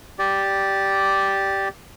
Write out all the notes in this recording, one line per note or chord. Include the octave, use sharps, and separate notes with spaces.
G4 D5